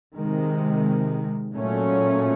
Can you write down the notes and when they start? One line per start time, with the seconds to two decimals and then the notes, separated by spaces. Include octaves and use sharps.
0.14 C3 D#3 G#3
1.53 A#2 F#3 A3 C#4